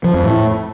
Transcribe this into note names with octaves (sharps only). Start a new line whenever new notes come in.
F3
F2
A2